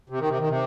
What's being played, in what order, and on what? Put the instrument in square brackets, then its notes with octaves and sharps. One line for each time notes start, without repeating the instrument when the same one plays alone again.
[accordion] C3
D#3
C3
D#3
C3